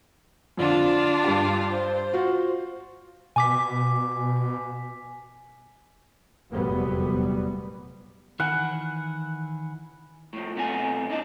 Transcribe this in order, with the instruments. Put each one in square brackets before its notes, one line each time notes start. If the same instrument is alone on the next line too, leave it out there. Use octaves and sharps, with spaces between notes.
[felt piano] F2 D3 [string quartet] D4 F4
[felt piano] C6
G2 G4
[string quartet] C5
[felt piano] F4 F#4
[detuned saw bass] B2 [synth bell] G#5 D6 B6
[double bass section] F1 E2 A#2 F#3 G3 B3
[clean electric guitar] D#3 E3 E4 [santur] F#5 [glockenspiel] G#5 B5
[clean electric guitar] A2 F3
B1 C3 A3 B3 G#4 G#5
D4 E4 D#5 A5